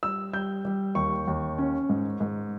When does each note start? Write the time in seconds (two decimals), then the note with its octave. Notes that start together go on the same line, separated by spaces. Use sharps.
0.03 G3 E6
0.33 G3 G6
0.65 G3
0.95 D#2 C#6
1.27 D#2
1.58 C#4
1.89 G#2
2.20 G#2